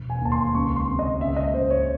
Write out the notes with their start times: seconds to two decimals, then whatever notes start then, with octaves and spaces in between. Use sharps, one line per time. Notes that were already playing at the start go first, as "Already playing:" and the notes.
Already playing: E1
0.10 G#5
0.21 D#2 A5
0.32 C6
0.55 C#2 C#6
0.76 C6
0.88 C3
0.99 D#5
1.21 C#2 E5
1.36 D#5
1.53 C#2 C5
1.70 C#5